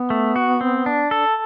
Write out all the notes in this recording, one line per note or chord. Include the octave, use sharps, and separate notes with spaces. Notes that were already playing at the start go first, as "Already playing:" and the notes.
Already playing: B3
A3
F#4
C4
D4
A4